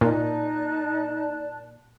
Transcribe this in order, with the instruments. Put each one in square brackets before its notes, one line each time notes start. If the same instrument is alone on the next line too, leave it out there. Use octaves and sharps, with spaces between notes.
[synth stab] A#2 [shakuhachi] D#4 [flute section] D5 A5 F#6